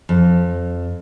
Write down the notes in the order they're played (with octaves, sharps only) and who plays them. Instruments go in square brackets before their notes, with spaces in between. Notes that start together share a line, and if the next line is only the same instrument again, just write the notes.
[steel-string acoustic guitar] F2